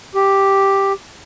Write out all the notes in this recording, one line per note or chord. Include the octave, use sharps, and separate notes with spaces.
G4